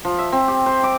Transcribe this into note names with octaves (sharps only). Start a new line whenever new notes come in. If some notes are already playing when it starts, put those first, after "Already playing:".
F3
E5
C4
G4
C5
D6